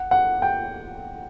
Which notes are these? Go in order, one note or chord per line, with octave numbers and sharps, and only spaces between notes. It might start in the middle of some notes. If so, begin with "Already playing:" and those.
Already playing: F#5
F#5
G5